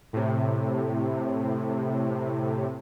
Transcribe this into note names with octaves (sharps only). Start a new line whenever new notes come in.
A2 C3